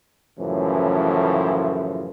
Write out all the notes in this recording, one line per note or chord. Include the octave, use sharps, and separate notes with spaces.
F#2 A2 C#3 E3 F3